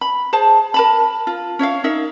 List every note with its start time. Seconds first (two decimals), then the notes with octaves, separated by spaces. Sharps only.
0.01 B5
0.33 G#4 C5 A5
0.74 A#4 A5 B5
1.27 F4
1.59 C#4 C#5 E5 F5
1.84 D#4 A#4 E5